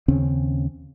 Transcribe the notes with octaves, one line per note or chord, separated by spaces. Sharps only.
D#2 C#3 C4 C#4